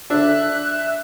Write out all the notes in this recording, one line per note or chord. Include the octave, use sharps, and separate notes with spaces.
D3 D4 E5 F#6